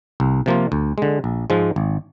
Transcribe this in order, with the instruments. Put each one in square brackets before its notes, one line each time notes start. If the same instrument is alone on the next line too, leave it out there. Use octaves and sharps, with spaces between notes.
[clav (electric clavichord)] C2
C3 F3 A#3 F4
D2
D3 G#3
A#1
G#2 F3 G#3
G#1